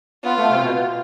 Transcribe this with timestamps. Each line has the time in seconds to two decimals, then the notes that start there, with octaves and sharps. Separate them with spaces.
0.24 B3 F4
0.38 A3
0.50 C3
0.63 B2